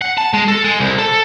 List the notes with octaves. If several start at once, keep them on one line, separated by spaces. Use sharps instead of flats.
F#5
A5
G#3
A4
G#3
C2
A4